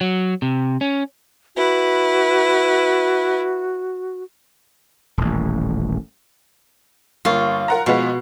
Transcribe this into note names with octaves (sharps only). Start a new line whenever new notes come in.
F#3
C3
C#4
E4 F#4 B4
D#1 A1
G1 A#3 F4 C#6
A#4 F#5 A#5
B2 F3 G#3 B3